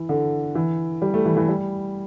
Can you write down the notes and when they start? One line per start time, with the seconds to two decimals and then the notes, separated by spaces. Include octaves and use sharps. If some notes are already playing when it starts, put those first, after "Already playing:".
Already playing: E3
0.09 D3
0.55 E3
1.02 G3
1.14 A3
1.25 E3
1.37 E3
1.48 G3